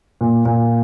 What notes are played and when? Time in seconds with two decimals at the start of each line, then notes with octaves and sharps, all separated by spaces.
0.21 A#2
0.45 A#2